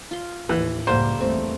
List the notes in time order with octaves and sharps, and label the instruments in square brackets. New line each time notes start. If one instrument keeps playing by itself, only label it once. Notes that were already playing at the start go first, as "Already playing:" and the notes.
[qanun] F4 C6
[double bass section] D#2 A2 [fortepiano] E3
[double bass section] C#2 F#2 A2 [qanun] G3 A#3 [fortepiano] C5
[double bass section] G1 E2 A3 [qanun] C4